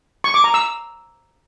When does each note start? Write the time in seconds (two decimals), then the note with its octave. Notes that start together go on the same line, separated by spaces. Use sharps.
0.24 C#6
0.34 D6
0.44 A#5
0.54 E6